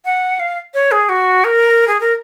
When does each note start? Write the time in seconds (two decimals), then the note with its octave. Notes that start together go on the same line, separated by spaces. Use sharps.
0.05 F#5
0.40 F5
0.74 C#5
0.92 G#4
1.09 F#4
1.44 A#4
1.88 G#4
2.00 A#4